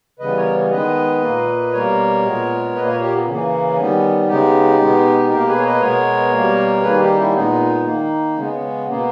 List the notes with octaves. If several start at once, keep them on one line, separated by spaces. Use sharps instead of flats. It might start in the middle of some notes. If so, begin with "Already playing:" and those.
C#3 E3 G3 B3 B4 D#5
A#4 C#5
D#3 G#3 B3 B4 D#5
A#2 A#3
B2 G3 A#3 A#4 C#5
A#2 G#3 B3
A#2 A#3 B4 D#5
A#4 C#5
G4 A#4
B3
C#3 E3 A#3 C#4
D#3 G3 B3
C#3 G#3 B3 D#4 G4
B2 G#3 B3
B2 A#3 G4 A#4
G#4 B4
C#5
B4 D#5
B2 G#3 B3 A#4 C#5
B2 G3 A#3
D#3 G3 A#3 G#4 B4
D#4 G4
C#4 E4
A#2 G#3 B3 D#4
D#3 A#3
C#3 G#3 B3 C#4
C#4
B2 A#3 B3